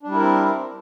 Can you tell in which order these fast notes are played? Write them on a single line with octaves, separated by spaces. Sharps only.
D4 G3 E4 A#4 C4